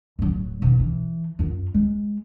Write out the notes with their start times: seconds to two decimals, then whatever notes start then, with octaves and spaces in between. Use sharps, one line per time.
0.19 D1 F#3
0.62 B2 D#3
0.80 E3
1.39 F#2 F4
1.74 G#3